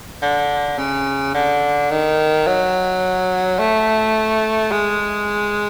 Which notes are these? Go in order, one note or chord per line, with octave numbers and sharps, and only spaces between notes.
D3
C#3
D3
D#3
F#3
A3
G#3